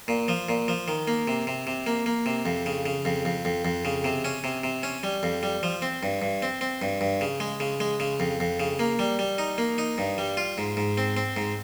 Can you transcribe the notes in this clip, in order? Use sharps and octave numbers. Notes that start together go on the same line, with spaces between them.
A#2
F3
A#2
F3
D#3
A#3
C3
C3
C3
A#3
A#3
C3
F2
C#3
C#3
F2
F2
F2
F2
C#3
C3
C#4
C3
C3
C#4
G3
F2
G3
F3
C4
G2
G2
C4
C4
G2
G2
C#3
G#3
C#3
G#3
C#3
F2
F2
C#3
A#3
G3
G3
D#4
A#3
D#4
G2
G3
F4
G#2
G#2
C4
C4
G#2